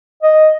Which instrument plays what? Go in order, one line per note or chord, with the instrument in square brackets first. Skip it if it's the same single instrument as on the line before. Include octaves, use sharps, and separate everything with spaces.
[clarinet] D#5